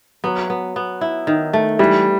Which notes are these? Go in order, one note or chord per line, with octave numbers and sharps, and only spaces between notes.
F#3 B3
B3
B3
E4
D#3
A3
E3 G3